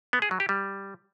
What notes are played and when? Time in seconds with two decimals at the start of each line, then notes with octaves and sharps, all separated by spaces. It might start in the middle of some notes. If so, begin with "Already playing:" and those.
0.13 B3
0.22 G#4
0.31 F#3
0.40 G4
0.49 G3